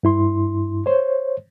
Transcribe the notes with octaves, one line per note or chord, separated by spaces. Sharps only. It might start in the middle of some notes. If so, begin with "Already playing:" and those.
G2 E4 C6
C5 C#5